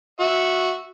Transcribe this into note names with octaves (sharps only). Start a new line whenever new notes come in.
F#4 E5